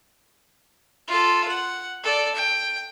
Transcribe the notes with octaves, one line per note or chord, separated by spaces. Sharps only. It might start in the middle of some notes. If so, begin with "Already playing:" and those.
F4 A4
F#5
A4 D5
G5